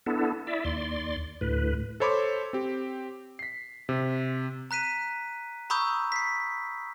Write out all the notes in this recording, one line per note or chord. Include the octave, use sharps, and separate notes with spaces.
B3 D4 E4 A4
E4 D5 E5
D#2 D5 C6
D2 A2 B4
A4 C5 C#5 B5 C6 D6
C4 G4
B6 C7
C3
A#5 F#6 B6 D#7
A#5 B5 C#6 D#6 E6 G6
B6 C7